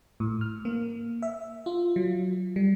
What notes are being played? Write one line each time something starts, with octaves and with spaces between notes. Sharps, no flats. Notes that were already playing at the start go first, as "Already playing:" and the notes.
A2
F6
A#3
E5
F4
F#3
G3